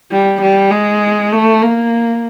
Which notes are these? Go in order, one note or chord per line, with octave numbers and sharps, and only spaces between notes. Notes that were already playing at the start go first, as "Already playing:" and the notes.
G3
G3
G#3
A3
A#3